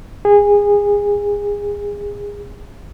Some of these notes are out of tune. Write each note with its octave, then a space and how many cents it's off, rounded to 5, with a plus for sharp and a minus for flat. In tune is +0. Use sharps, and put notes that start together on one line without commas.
G#4 -25